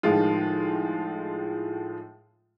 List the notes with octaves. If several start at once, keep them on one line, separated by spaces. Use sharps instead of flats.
A2 D#3 F3 G#3 F4